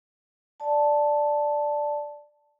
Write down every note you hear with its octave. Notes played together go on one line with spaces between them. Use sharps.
D5 A5